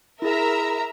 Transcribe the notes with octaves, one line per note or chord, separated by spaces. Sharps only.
E4 G#4 A#4 E5 A#5